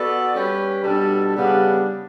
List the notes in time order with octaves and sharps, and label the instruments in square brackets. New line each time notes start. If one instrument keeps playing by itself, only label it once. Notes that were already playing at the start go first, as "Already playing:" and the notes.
Already playing: [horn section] B3 F#4 A4 D5
G3 C#4 G4 B4
B2 G3 D4 A4
C#3 G3 B3 D4